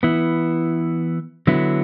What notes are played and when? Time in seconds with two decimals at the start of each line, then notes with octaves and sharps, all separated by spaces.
0.03 E3 B3 E4
1.47 D3 F#3 B3 E4